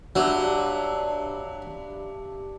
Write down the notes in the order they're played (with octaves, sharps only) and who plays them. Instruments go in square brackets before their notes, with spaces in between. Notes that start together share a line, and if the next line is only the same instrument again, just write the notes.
[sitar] G2 [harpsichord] F#3 [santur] D4 E5